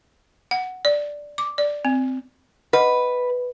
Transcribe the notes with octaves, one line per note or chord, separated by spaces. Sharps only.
F#5
D5
D6
D5
C4
B4 D#5 F#5 B5